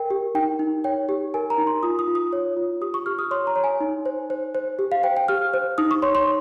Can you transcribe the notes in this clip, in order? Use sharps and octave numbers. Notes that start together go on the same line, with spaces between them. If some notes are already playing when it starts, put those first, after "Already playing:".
Already playing: A#4 G5
G4
D#4 G5
D#4
C#5 G5
G4
A#4 G#5
A#5
D#4
C6
F4 D#6
D#6
F4
D#6
C#5
F4
G4 D#6
C#6
G4 F6
D#6
C#5 C6
A#5
C#5
G#5
D#4
C5
C5
C5
G4
F5
C5 G5
G5
G4 F6
C5
D#4 D#6
C#6
C#5 C6
C6